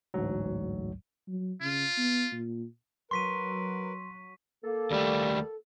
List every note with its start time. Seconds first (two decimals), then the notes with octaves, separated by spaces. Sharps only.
0.14 A1 D2 G#2 F#3
1.28 F#3
1.61 C#3 F4
1.97 B3
2.32 A#2
3.11 F#3 A#4 B4 C6 C#6 B6 D#7
4.64 A#3 A4
4.91 D#2 G3 A3